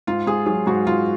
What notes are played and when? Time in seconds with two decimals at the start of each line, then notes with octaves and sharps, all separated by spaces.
0.07 G#2 F4
0.27 G#2 G#4
0.46 F#3 G#4
0.67 G#2 F#4
0.87 G#2 F4